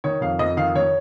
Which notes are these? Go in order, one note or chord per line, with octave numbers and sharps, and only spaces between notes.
D#3 C#5
F2 F5
F2 D#5
D#3 F5
D#3 C#5